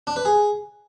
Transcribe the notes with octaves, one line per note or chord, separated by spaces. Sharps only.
D4
B4
G#4